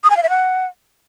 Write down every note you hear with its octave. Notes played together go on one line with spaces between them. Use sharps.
D#6
G#5
F5
E5
F#5